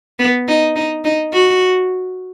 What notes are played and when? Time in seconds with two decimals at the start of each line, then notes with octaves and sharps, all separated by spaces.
0.19 B3
0.48 D#4
0.76 D#4
1.04 D#4
1.33 F#4